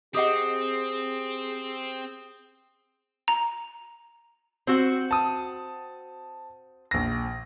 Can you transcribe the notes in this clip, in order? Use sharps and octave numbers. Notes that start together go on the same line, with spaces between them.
C4 G4 G#4 D#5 F#5 D#6 C7
A#5
C4 F#4
A5 D#6
A#1 A#6